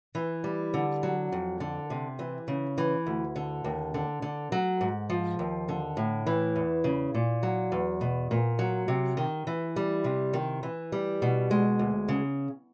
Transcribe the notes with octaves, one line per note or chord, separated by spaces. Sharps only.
E3
G3
D3
F#3
F2
D3
C3
E3
C#3
E3
D2
D3
D#2
D3
D3
F#3
G#2
F3
D#2
D3
A2
E3
E2
C#3
A#2
F#3
E2
B2
A#2
F#3
C3
D#3
E3
G3
C3
D#3
E3
G3
B2
G#3
D2
C#3